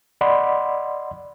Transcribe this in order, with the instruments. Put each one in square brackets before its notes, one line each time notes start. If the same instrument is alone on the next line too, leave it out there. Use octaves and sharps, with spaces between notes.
[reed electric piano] D5 D#5 F#5 B5 C6